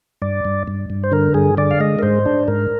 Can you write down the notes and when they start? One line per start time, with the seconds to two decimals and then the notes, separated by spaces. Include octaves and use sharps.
0.22 G2 D5
0.45 G2
0.68 G2
0.90 G2
1.04 C5
1.12 D3 A#4
1.34 G2 G#4
1.57 D3 D5
1.71 F5
1.80 G#3 D#5
1.99 A#4
2.03 G#2 C5
2.26 D4
2.48 G#2 A#4